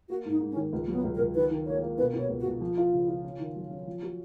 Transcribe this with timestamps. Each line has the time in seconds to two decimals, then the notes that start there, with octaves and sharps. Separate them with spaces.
0.09 A#3 F#4
0.25 G#2 D#4
0.41 G#2
0.51 C#4
0.56 D#3
0.73 C#2
0.86 F#3 A#3
0.93 B3
1.04 C#2
1.15 A#4
1.19 C#2
1.35 D#3 B4
1.51 D#3
1.66 A#3 C#5
1.82 A#3
1.98 B2 B4
2.14 B2 C#5
2.29 C#2
2.40 F#4
2.46 C#2
2.61 F3
2.77 F4
2.93 C#3
3.08 F4
3.24 C#4
3.39 D#3
3.56 F#3
3.71 C#4
3.87 F3
4.03 F#4